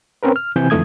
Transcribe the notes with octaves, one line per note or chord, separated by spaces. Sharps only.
C4 C#4 A#4 B4
F6
C3 E3 C4 G#5 G6
F2 D3 E3 A3 D#6 G#6